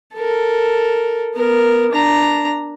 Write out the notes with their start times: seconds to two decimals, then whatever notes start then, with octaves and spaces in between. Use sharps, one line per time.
0.15 A4 A#4
1.35 B3 A#4
1.92 D4 A#5